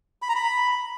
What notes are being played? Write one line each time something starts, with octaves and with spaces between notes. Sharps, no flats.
B5
A#5
B5